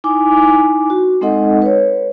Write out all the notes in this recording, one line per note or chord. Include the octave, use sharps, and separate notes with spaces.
D#4 E4 G#5 D6
F#4
G#3 C4 D#4 A4 D#5 F#5
B4 C#5